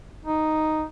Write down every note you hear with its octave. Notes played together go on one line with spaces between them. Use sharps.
D#4